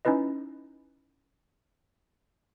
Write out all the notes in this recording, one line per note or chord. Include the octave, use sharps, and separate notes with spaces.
C#4 D#4 E4 B4 D#5